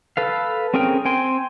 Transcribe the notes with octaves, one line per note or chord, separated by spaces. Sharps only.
A4 B4 F5
C4 C#4 G#4 A#4 G5
C4 G5 G#5 C6